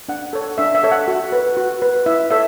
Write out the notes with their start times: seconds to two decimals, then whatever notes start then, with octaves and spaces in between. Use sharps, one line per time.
0.09 D4 F#5
0.33 A4 C#5
0.58 D4 E5
0.75 E5
0.83 A4 C#5
0.92 F#5
1.08 F#4
1.32 B4
1.57 F#4
1.82 B4
2.06 E4 E5
2.30 A4 C#5 E5